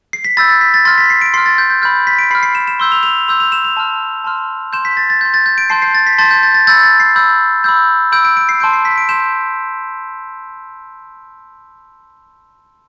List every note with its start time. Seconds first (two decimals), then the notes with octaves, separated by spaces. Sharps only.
0.13 C7
0.25 B6
0.37 B5 E6 G6 A6
0.50 A6
0.61 B6
0.74 A6
0.85 C6 F6 A6
0.98 B6
1.10 C7
1.22 D7
1.34 C6 C7
1.38 F6
1.46 A6
1.58 G6
1.70 G6
1.82 B5 F6 G6
2.07 B6
2.19 D7
2.31 B5 C7
2.35 F6
2.43 C7
2.55 E7
2.68 E7
2.79 C6 E6 G6 G7
2.92 F7
3.03 F7
3.28 C6 E6 G6 F7
3.40 F7
3.52 E7
3.65 F7
3.77 A5 C6 F6
4.24 A5 C6 F6
4.73 C6 G6 E7
4.85 B6
4.97 A6
5.10 A6
5.21 C6 G6
5.34 A6
5.46 G6
5.58 D7
5.70 A5 C6 G6 C7
5.82 C7
5.95 A6
6.07 B6
6.18 A5 C6 G6 A6
6.31 G6
6.43 A6
6.55 A6
6.67 B5 E6 G6 A6
6.83 A6
7.00 C7
7.15 B5 E6 G6
7.64 B5 E6 G6
8.12 B5 E6 G6 D7
8.25 D7
8.37 D7
8.49 C7
8.60 A5 C6 G6 D7
8.73 C7
8.85 B6
8.98 D7
9.09 A5 C6 G6 E7